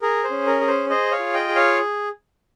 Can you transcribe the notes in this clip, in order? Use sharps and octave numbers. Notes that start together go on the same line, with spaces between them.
G#4 A#4
C5
C#4
A#4
G#4
C5
G#4 C5 D#5
C#5 F5
F4
D#5 G5
G#4
C#5 F5